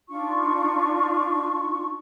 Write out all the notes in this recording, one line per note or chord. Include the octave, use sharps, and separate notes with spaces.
D4 D#4 F4 C#6